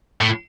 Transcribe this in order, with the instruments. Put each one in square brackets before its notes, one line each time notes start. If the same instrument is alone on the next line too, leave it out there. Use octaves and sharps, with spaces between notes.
[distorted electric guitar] A2